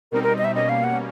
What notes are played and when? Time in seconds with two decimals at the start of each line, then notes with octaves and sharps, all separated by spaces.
0.12 B2 G3 C4 D#4 A#4
0.23 A#4
0.38 D#5
0.44 E5
0.55 B2 G3 A#3 C#4 D#5
0.69 F5
0.84 F#5